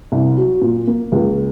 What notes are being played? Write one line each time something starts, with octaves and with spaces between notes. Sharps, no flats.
C2
F#3
A#2
A#3
C#2